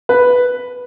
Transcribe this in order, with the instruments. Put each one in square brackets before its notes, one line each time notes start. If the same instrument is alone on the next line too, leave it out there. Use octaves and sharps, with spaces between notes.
[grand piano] B4